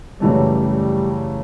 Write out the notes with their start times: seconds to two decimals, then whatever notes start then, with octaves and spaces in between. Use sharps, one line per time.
0.20 F#2 C#3 E3 G3 A3
0.68 G3